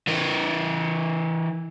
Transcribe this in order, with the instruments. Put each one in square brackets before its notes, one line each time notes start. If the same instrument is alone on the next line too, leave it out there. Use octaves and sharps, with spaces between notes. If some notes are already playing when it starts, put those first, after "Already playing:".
[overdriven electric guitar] E3 A#4